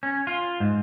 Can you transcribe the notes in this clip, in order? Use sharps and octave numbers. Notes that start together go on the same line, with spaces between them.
C#4
F4
G#2